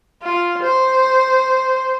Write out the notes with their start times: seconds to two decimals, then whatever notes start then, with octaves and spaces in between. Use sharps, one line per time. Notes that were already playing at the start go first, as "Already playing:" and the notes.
0.22 F4
0.63 C5